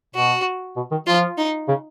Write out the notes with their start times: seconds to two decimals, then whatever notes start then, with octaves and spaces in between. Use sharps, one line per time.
0.15 B2 F#4
0.76 B2
0.91 D#3
1.07 F3 F4
1.38 D#4
1.68 C#3